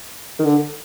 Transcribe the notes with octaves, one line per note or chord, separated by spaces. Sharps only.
D#3
D3